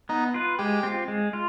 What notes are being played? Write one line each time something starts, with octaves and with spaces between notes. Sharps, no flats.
B3 D#4
F4 B4
G#3 G4
C4 F4
G#3
F4